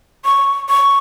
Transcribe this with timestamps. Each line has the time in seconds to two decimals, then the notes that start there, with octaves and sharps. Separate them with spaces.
0.25 C#6
0.69 C#6